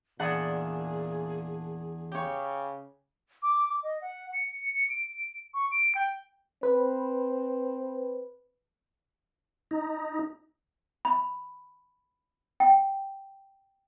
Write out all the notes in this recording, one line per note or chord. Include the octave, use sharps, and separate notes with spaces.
E2 A#2 D4 G#4 F#5 D#6
C#3 G4 C#5
D6
D6
D#5
F#5
C#7
C#7
D7
C#6
D7
G5
C4 B4
D#4
B5
G5